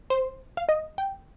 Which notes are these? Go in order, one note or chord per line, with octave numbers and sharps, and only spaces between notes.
C5
F5
D#5
G5